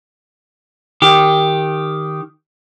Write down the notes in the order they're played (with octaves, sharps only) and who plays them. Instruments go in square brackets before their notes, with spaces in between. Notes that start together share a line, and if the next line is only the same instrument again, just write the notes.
[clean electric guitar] D#3 G4